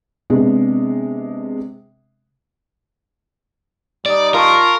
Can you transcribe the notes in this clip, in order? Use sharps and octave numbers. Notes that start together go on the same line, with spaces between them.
C3 G#3 B3 D4
G3 D#4 D5 D#6
F4 A#4 F5 A5 C#6